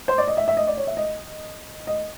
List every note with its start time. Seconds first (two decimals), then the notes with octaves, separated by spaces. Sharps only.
0.08 C5
0.18 D5
0.28 D#5
0.37 E5
0.48 E5
0.57 D#5
0.67 D5
0.77 C#5
0.87 E5
0.97 D#5
1.87 D#5